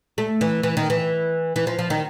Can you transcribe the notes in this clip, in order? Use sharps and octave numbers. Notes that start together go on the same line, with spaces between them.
A3
E3
E3
D#3
E3
E3
F3
F3
D#3